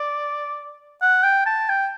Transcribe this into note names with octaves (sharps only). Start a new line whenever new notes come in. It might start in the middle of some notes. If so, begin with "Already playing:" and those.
Already playing: D5
F#5
G5
A5
G5